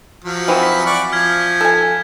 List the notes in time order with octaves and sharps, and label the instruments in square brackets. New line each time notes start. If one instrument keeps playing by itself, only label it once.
[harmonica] F3 F#3
[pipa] E3 C4 F#4
[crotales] B6
[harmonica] D5 F#5 C#6
[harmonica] F3 [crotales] F6 G#6 B6
[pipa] A4 G#5